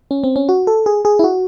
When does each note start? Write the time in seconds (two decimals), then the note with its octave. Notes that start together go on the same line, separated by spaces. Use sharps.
0.11 C#4
0.24 C4
0.36 C#4
0.49 F#4
0.67 A4
0.86 G#4
1.05 G#4
1.19 E4
1.24 F#4